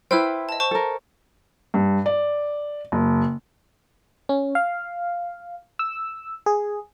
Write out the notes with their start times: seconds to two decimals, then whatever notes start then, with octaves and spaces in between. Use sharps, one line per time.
0.11 E4 B4 C5 G5 E6 F6
0.49 D#5 A5
0.60 C5 A5 C#6
0.71 A4 A#4
1.74 G2
2.06 D5
2.92 F#1
4.29 C#4
4.55 F5
5.79 E6
6.46 G#4